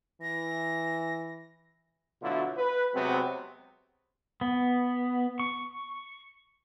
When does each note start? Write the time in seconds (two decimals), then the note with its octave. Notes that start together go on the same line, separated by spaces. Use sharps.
0.21 E3 A#6
2.22 B2 D3 F#3 A3 E4 F4
2.57 B4
2.94 C3 F#3 G#3 B3 C4
4.41 B3
5.39 C#6